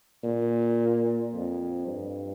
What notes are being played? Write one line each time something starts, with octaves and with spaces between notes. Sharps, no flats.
A#2
F2
G2